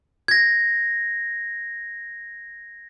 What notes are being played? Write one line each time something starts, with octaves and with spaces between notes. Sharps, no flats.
G#6 A#6